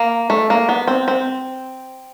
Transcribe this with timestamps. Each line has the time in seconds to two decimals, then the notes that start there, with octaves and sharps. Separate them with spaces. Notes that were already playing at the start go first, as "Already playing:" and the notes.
Already playing: A#3
0.30 A3
0.50 A#3
0.69 B3
0.87 C4
1.08 C4